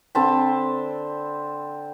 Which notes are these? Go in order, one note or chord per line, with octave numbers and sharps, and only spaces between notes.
D3 C4 A5 B5